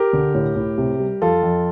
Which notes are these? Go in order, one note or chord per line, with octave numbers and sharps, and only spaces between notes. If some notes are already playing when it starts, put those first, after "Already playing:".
Already playing: G4 A#4
D3
A2
A2
C3
G3
F2 F4 A4
F2